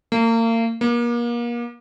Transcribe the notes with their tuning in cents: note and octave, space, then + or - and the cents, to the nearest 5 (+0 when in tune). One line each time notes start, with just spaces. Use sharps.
A#3 -35
A#3 +35